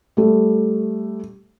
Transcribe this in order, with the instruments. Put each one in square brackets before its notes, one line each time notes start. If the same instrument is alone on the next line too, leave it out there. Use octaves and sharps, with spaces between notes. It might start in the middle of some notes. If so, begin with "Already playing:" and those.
[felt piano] G3 A3